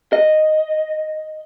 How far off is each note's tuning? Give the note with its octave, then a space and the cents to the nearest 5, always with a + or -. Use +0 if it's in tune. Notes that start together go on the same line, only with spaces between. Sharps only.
D#5 -5